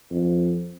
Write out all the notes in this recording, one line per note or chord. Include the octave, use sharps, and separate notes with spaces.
F2